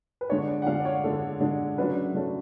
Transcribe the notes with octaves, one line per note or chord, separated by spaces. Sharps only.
B4
D3 G#3 D4 C#5
D5
F#5
D3 G#3 D4 F5
D5
C#5
D3 G#3 D4 A4
D3 G#3 D4
C#3 F#3 A3 D4 B4
C#3 F#3 A3 D4